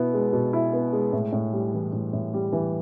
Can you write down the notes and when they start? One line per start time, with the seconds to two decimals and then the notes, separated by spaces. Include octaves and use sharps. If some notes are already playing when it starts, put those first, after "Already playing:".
Already playing: B2 B3 E4
0.14 G#3
0.33 B2
0.53 E4
0.73 B3
0.93 G#3
1.12 A2
1.33 A2
1.53 G3
1.74 E3
1.92 A2
2.13 A2
2.34 G3
2.52 E3